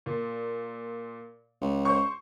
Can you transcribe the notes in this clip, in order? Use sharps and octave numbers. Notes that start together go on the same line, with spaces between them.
A#2
C#2
C5 C#6